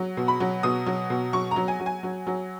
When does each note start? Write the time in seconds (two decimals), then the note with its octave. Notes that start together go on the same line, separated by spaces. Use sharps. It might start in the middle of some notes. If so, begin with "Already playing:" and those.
Already playing: F#3
0.17 B2
0.28 B5
0.40 F#3
0.63 B2 D#6
0.86 F#3
1.10 B2
1.33 F#3 C#6
1.51 F#3 A#5
1.68 G#5
1.80 F#3
1.86 G#5
2.03 F#3
2.27 F#3